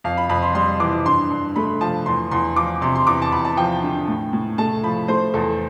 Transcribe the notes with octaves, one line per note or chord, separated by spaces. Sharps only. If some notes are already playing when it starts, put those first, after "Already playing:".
F2 F5
B5
F2 B5
C6
G3 C6
E3 D6
G2 C6
G2
A3 B5
F3 A5
E2 C6
E2 C6
F3 D6
C3 C6
C6
E2 D6
A5
E2 B5
A5
F3 G5
D3
A2
A2
A3 A5
F3 B5
A3 C5
E2 A4